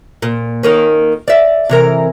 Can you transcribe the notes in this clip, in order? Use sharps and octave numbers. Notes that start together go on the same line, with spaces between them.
A#2
D#3 A#3 C#4
D5 E5
C3 E3 A#4